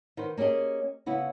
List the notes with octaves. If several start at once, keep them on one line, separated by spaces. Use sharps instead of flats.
D#3 F#4 B4 C5
A#3 C#4 G4 G#4 D#5
C#3 B3 E4 F#4